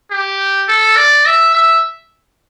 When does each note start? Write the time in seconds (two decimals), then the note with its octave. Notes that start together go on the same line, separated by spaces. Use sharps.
0.11 G4
0.68 A4
0.96 D5
1.26 E5
1.55 E5